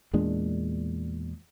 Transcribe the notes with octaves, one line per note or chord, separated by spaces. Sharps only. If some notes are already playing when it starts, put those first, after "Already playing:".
E2 A#2 G#3 D4